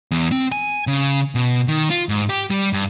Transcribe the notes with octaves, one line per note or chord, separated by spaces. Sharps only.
E2
C4
G#5
C#3
B2
D#3
F4
G#2
G4
G3
G2